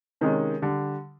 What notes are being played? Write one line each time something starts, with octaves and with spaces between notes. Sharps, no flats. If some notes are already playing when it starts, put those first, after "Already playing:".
C3 D#3 G#3 C#4
D3 G3